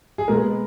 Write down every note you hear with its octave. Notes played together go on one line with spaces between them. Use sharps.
G#4
B2 G#3 B3 A#4